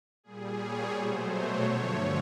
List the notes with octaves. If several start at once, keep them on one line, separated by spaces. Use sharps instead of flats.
A#2 G3 G#4
C#5
B2 F#3 A3 C5
C#5
G2 D3 F3 A3